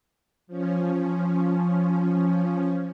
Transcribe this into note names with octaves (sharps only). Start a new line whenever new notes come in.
F3 C#4